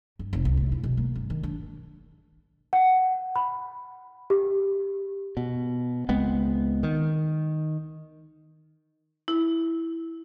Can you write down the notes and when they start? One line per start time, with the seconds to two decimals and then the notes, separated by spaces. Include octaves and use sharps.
0.19 G2
0.33 F1
0.45 C2
0.57 A2
0.72 E4
0.83 B2
0.97 A#3
1.15 G2
1.30 D#3
1.43 D4
2.73 F#5
3.36 B5
4.30 G4
5.37 B2
6.09 C#2 G#3 B3 C4
6.83 D#3
9.28 E4